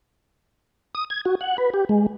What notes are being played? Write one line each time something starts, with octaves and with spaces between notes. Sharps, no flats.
D#6
G#6
F#4
F#5
B4
G4
G#3